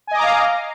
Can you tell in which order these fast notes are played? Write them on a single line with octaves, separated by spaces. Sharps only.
G#5 D#5 D6 A#5 F5